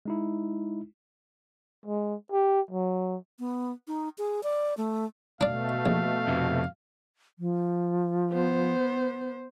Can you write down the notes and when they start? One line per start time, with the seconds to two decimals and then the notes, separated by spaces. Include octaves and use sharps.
0.05 G#3 D#4 E4
1.86 G#3
2.32 G4
2.71 F#3
3.39 B3
3.88 D#4
4.18 G#4
4.43 D5
4.77 A3
5.41 B2 A3 D4 D5 F5
5.86 A#1
6.28 F2 C3
7.39 F3
8.31 B3 C5